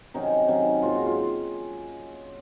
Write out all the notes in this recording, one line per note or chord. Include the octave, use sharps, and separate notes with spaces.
C3 D#3 F#3 C#4 D#4
C3 D#3 F#3 C#4
G#2 F#3 A#3 F4
F#4
F4